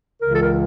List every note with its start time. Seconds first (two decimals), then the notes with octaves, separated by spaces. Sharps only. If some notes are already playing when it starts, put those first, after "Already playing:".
0.22 C#2 C#3 E3 A#4
0.32 A4
0.42 A#4